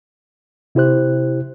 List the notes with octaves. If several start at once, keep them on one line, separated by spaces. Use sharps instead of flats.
C3 E4 G4 C5 F#6